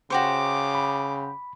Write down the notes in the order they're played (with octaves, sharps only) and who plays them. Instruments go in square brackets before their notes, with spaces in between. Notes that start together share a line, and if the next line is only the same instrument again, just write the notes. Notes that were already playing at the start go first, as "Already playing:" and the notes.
[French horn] C#3 [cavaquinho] F#4 G4 C5 [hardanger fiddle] D6
[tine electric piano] B5